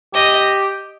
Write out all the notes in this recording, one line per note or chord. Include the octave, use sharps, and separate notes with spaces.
G4 D#5